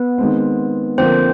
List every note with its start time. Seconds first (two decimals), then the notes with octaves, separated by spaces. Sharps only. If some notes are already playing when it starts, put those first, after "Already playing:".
Already playing: B3 B4
0.18 D#3 G#3 C4
0.98 D3 F3 A#3 C4 C5